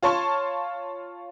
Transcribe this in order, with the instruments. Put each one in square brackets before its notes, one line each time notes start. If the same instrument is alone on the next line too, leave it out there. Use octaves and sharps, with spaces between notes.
[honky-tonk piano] F4 C#5 A5 C6 C#6